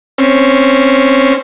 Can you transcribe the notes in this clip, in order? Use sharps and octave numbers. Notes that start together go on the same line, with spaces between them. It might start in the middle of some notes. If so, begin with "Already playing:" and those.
C4 C#4